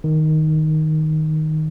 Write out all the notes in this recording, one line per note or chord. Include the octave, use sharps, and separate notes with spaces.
D#3